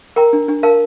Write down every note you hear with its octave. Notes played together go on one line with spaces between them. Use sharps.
A#4 G5 A#5
D4
D4
A#4 F5 A5